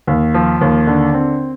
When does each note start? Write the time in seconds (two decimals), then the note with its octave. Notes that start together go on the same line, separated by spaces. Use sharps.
0.07 D#2
0.34 F3
0.61 D#2
0.87 D3
1.14 C4